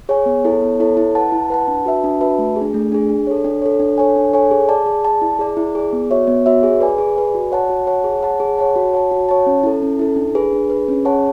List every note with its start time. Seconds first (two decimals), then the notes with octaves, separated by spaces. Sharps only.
0.09 G#4 C#5 G#5
0.26 B3
0.45 E4 A4 C#5
0.62 B3
0.80 E4 A4 C#5
0.97 E4
1.15 B4 F#5 A5
1.32 E4
1.50 B4 F#5 A5
1.68 D4
1.86 F#4 B4 E5 A5
2.04 D4
2.21 F#4 B4 E5 A5
2.39 A3
2.56 G#4
2.61 D4
2.74 A3
2.92 D4 G#4
3.09 D4
3.27 A4 C#5
3.44 D4
3.62 A4 C#5
3.80 D4
3.98 A4 C#5 G#5
4.16 D4
4.33 A4 C#5 G#5
4.51 G#4
4.69 D5 A5
4.86 G#4
5.05 D5 A5
5.22 E4
5.39 G#4 D5
5.57 E4
5.75 G#4 D5
5.93 B3
6.11 F#4 C#5 E5
6.27 B3
6.46 F#4 C#5 E5
6.63 G#4
6.80 B4 D5 G#5
6.98 G#4
7.16 B4 D5 G#5
7.34 F#4
7.52 C#5 F#5 A5
7.70 F#4
7.87 C#5 F#5 A5
8.04 G#4
8.23 C#5 F#5 A5
8.40 G#4
8.58 C#5 F#5 A5
8.76 F#4
8.93 C#5 F#5 A5
9.11 F#4
9.29 C#5 F#5 A5
9.47 C#4
9.63 E4 A4
9.82 C#4
9.99 E4 A4
10.16 D4
10.35 G#4 B4
10.53 D4
10.70 G#4 B4
10.88 C#4
11.05 G#4 C#5 F#5 A5